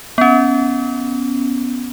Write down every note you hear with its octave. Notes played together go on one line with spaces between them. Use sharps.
B3 C#4